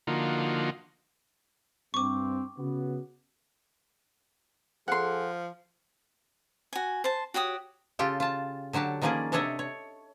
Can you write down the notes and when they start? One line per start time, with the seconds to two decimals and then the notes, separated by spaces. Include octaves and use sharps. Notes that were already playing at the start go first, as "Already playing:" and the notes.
0.07 D3 F3 A#3 D#4 F4 F#4
1.94 G2 C4 C#6 D6
2.58 C#3 B3 F#4
4.88 F3 G#4 A4 F#5 C6
6.73 F#4 G#5
7.04 C5 A5
7.34 F#4 G4 C#5 D#6
7.99 C#3 F4 G4 A4 G5
8.20 F4 A5
8.73 D3 F#3 F#4 G4 A5
9.02 D#3 F3 A#3 C#4 G#4 D5
9.32 C3 D4 A4 C#5 D#5 E5
9.59 C#5